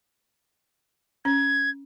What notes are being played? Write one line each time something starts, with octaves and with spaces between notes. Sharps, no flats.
C#4 G#6